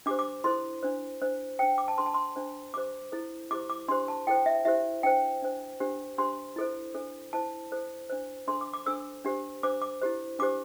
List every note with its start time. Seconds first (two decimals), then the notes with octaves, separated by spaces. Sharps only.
0.06 D4 G4 C5 D6
0.19 D6
0.44 E4 A4 C5 C6
0.83 D4 C5
1.22 D4 C5
1.59 D4 C5 G5
1.78 D6
1.88 A5
1.98 D4 A4 C5 C6
2.06 A5
2.14 C6
2.36 D4 C5
2.74 D4 G4 C5 D6
3.12 E4 A4 C5
3.51 E4 G4 C5 D6
3.70 D6
3.88 D4 G4 C5 C6
4.08 A5
4.27 E4 A4 C5 G5
4.46 E5
4.65 E4 G4 C5 E5
5.03 D4 C5 G5
5.42 D4 C5
5.80 D4 G4 C5
6.18 D4 G4 C5 C6
6.56 E4 A4 C5
6.94 D4 A4 C5
7.33 E4 C5 A5
7.72 E4 A4 C5
8.10 D4 C5
8.47 D4 A4 C5 C6
8.61 D6
8.74 D6
8.86 D4 A4 C5 E6
9.25 D4 G4 C5
9.63 D4 C5 D6
9.82 D6
10.02 E4 G4 C5
10.39 D4 G4 C5 D6